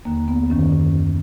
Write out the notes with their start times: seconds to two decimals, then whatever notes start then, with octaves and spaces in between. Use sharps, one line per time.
0.05 D#2 D3 A#3
0.28 B3
0.50 F#2 D#3 C#4